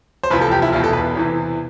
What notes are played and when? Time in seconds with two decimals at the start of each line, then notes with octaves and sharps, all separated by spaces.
0.23 C5
0.31 F1 E2 C3 F3 B4
0.41 A4
0.52 G4
0.62 E4
0.72 E1 E2 B2 F4
0.84 A4
0.93 B4
1.15 E2 C3 E3